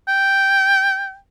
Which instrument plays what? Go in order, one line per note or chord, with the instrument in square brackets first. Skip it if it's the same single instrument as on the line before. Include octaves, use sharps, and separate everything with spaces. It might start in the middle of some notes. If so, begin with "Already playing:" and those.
[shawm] G5